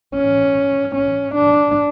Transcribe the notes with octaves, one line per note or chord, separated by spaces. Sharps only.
C#4
C#4
D4